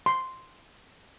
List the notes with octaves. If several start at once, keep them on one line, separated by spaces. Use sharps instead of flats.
C6